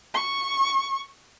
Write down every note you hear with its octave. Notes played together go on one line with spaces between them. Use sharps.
C#6